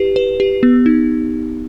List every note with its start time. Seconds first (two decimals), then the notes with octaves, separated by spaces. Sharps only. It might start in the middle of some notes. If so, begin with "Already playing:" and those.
Already playing: E4 G4 B4
0.16 B4
0.40 G4
0.63 B3
0.86 D#4